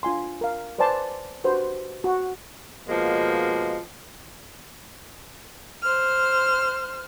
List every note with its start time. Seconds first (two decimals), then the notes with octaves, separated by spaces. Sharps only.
0.03 D4 F4 G#5 C6
0.41 A#4 F5
0.78 B4 C5 D5 G#5 A5 C6
1.44 D4 F#4 G4 B4 C5
2.04 F#4
2.88 B2 F3 G#3 A#3
5.82 C5 F6